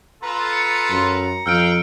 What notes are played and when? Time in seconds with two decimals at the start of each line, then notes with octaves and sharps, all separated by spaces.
0.22 F4 A4 B4 A#5
0.53 C#7
0.90 F#2
1.46 F2 F5 G5 E6 F6 D7